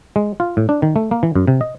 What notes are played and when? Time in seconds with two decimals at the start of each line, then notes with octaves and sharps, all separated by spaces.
0.16 G#3
0.40 F4
0.57 A2
0.69 D4
0.82 D#3
0.96 A3
1.11 A#3
1.23 E3
1.35 F#2
1.47 C3
1.61 D#5